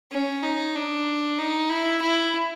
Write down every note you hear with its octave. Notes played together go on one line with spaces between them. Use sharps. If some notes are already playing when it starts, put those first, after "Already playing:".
C#4
D#4
D4
D#4
E4
E4